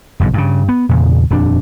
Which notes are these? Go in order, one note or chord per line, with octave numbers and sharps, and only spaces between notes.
F#1 B1 G#2
G2 C#3
B3
E2 A#2 C#3
D#1 F2 D4